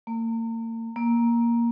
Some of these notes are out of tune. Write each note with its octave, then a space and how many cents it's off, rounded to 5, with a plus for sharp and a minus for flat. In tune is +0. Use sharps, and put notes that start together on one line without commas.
A#3 -40
A#3 +10